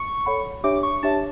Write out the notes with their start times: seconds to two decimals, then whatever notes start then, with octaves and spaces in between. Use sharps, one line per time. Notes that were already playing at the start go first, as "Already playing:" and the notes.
Already playing: C#6
0.26 A4 C#5 F#5 B5
0.64 D4 G4 C#5 E5 D6
0.83 C#6
1.03 D4 G4 C#5 E5 A5